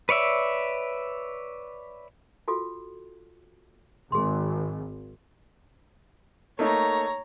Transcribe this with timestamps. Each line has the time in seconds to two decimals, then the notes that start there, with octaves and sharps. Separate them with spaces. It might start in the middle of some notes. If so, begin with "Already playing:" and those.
0.09 B4 C#5 D5 E5
2.48 F4 F#4 A4
4.12 G#1 G#4 C6
6.59 A3 A#3 D#4 C#5 A#5